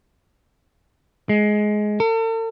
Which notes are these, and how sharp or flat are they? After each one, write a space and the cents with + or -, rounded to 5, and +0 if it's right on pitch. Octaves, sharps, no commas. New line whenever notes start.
G#3 +15
A4 +45